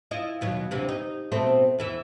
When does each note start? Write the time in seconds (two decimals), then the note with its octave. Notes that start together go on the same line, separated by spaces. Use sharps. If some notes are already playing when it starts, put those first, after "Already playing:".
0.11 E4 F4 D#5
0.41 D#2 B2 F#3
0.71 D2 C3 E3
0.89 D#4
1.32 B2 A3 C4
1.79 E2 E3 E5